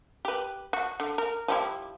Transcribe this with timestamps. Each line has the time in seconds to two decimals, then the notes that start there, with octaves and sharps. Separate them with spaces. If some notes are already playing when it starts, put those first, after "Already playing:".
0.25 G4 B4
0.73 F#4
1.00 D3
1.18 A#4
1.48 F3 G3 E4